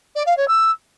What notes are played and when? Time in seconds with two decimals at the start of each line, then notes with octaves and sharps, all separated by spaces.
0.15 D5
0.26 F5
0.37 C#5
0.48 E6